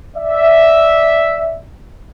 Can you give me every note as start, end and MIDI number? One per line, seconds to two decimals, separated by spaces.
0.16 1.64 74
0.16 1.64 76